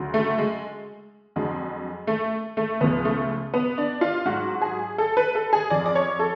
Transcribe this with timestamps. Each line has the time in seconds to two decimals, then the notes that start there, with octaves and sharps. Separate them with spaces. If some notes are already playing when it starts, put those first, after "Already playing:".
Already playing: D2 C#3 F#3
0.14 A3
0.38 G#3
1.36 F2 D3 F#3 G#3
2.07 A3
2.57 A3
2.81 C#2 C#3 F3 B3
3.05 A3
3.54 B3
3.78 D4
4.01 F4
4.25 G#2 F#3 F#4
4.62 G#4
4.98 A4
5.17 B4
5.35 A4
5.53 G#4
5.70 F2 F3 D5
5.86 D5
5.95 C#5
6.19 A4